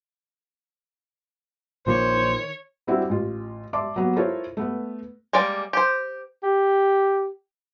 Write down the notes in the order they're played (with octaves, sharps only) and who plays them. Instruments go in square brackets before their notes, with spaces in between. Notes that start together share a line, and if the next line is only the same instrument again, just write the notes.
[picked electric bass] A#1 F3 A#3 [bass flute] D#3 [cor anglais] C5 [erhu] C#5
[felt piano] G3 C4 D4 E4 F#4
A1 F4
D5 E5 A5 C6 D6
F#3 A#3 B3
E4 F4 A4 A#4 C5 C#5
A3 B3 B4
[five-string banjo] G3 G#3 A#3 D5
G4 C5
[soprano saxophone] G4